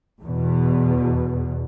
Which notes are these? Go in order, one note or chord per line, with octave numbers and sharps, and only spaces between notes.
E2 B2